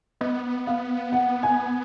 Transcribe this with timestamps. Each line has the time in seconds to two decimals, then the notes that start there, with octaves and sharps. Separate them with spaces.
0.21 B3 D#5
0.67 F5
1.12 F#5
1.43 G#5